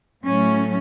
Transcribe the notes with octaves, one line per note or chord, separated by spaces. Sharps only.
A2 F#3 A3 C#4